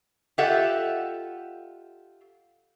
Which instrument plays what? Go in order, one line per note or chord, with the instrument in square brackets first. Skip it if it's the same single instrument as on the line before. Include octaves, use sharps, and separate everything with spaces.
[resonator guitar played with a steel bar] F4 G4 A4 D#5 E5 F#5